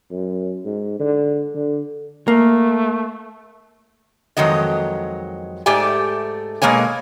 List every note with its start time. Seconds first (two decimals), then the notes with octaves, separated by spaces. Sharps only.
0.11 F#2
0.64 G#2
1.00 D3
1.55 D3
2.28 A3 A#3
4.37 F2 D#3 F#3 G#3 D#5
5.66 G#2 A3 G4 D5 G#5
6.62 B2 G#3 A#3 C#5 G#5